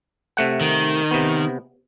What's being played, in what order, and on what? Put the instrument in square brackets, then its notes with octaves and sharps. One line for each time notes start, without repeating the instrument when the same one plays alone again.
[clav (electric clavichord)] C3 A3 F#5
[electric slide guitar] D#3
[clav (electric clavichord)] C3 B3